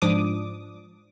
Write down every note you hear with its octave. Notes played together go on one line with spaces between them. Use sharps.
G#2 F3 D4 D6 D#6